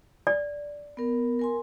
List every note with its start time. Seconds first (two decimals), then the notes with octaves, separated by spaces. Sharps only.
0.27 D5
0.97 B3 A#4
1.39 A#4 G#5 C6